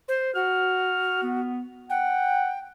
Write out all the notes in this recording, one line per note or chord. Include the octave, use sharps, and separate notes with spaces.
C5
F#4 F6
B3
F#5 G5